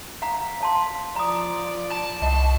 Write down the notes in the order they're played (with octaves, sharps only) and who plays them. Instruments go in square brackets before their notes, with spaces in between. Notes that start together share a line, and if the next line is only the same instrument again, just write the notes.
[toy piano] F5 F#5 A#5
F5 A5 C6
[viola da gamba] F3 D5 [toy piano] A#5 D#6
[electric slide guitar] A5
[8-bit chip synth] C2 [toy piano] D#5 F#5